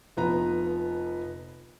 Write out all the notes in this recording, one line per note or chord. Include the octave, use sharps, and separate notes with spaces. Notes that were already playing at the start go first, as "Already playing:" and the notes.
F1 F3 B3 B4 A#5